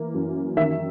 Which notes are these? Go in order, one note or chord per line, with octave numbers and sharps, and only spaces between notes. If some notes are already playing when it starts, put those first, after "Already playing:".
Already playing: E3 A#3
F#2
D#3 E5